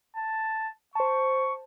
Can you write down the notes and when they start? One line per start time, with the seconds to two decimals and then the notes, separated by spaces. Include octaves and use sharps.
0.17 A5
0.95 C5 A5 C#6